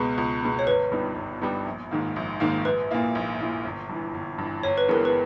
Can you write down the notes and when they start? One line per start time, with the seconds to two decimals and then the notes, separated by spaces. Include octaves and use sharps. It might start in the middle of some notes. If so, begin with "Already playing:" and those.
Already playing: C#2 B2 G#3 B3
0.18 C#2
0.43 B2 G#3 B3
0.59 C#5
0.66 G1 B4
0.92 G2 G3 B3 D#4
1.16 G1
1.42 G2 G3 B3 D#4
1.66 A#1
1.91 G#2 D#3 A#3
2.16 A#1
2.40 G#2 D#3 A#3
2.65 A#1 B4
2.91 A#2 A#3 E4
3.15 A#1
3.39 A#2 A#3 E4
3.64 G1
3.89 G2 E3
4.14 G1
4.38 G2 E3
4.63 G1 C#5
4.78 B4
4.88 G2 E3 G#3 B3 A#4
5.05 B4